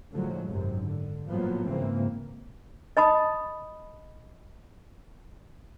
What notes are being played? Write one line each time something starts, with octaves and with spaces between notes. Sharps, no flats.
A2 D3 F3 F#3 G#3
G#1 F#2 C3
D3
A2 F3 F#3 A#3 B3
G#2 C#3 E3 A#3 C4
D#5 A5 B5 D#6